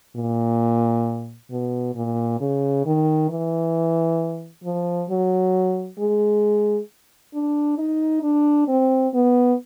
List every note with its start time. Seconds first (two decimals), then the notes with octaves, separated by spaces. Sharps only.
0.16 A#2
1.51 B2
1.95 A#2
2.40 C#3
2.86 D#3
3.30 E3
4.64 F3
5.10 F#3
5.99 G#3
7.34 D4
7.78 D#4
8.23 D4
8.68 C4
9.14 B3